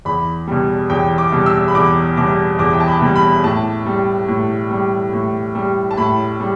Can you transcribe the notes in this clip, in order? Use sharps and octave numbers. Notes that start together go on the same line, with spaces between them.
E2 B5
B2 G3
E2 G5
D6
B2 G3
E6
B5
E2 D6
B2 G3 D6
E2 D6
G5
A5
B5
B2 G3
B5
A2 A5
G3
A2
G3
A2
G3
A5
A2 B5
G3